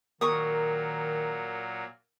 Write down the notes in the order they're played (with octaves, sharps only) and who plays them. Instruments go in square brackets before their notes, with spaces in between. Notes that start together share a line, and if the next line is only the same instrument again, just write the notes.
[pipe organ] A#2 F#3 [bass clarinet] D#3 [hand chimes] A#4 [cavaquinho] C#6 D#6